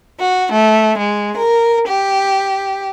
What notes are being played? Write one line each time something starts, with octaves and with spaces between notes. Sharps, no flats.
F#4
A3
G#3
A#4
G4